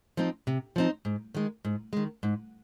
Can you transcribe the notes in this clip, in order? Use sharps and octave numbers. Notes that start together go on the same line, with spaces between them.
F3 C4 D#4
C3
F3 C4 D#4
G#2
D#3 G#3
G#2
D#3 G#3
G#2